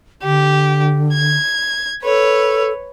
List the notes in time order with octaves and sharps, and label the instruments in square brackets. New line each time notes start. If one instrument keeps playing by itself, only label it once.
[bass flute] D3 [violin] G4
[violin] G#6
[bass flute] A4 [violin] B4 C#5